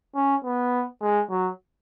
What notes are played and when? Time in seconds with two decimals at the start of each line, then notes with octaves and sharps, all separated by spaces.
0.15 C#4
0.44 B3
1.02 G#3
1.30 F#3